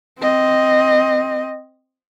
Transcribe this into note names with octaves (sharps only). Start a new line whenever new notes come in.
C4 D#5